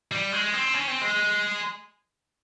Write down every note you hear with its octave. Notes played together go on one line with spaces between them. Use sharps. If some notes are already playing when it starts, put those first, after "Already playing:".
G3
G#3
C4
C#4
C4
G#3